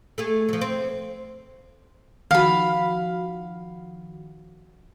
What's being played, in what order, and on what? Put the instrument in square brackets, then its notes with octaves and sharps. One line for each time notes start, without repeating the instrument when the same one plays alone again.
[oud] A3 G#4
F3 F#3
C4
[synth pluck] D#3 F3 F#4 [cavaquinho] F5 B5